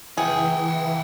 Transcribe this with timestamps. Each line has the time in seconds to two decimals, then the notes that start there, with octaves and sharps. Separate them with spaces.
0.17 E3 G#4 F#5 G5